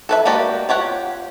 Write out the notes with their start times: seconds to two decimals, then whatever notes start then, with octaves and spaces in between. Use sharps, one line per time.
0.09 A4 B4 E5
0.25 G#3 A#3 F#4 G4 D5
0.69 F4 G4 C#5 F#5